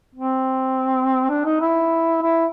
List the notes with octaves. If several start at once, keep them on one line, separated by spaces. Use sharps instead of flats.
C4
D4
D#4
E4
E4